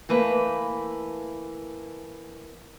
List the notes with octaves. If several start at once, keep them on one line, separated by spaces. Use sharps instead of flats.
E3 A3 A#3 B4